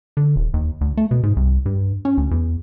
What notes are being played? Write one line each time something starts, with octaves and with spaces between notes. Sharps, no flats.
D3
D#1
D#2
D2
A3
B2
G#2
C2
G2
C#4
D2
E2